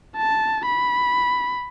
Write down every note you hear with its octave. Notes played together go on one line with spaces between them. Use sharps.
A5
B5